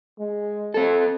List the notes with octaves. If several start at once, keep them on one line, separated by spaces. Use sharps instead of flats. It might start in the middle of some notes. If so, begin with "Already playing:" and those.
G#3
C4 A4